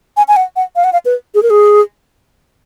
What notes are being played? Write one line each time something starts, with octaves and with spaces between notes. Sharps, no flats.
G#5
G#5
F#5
F#5
F5
F#5
F5
B4
G#4
A#4
G#4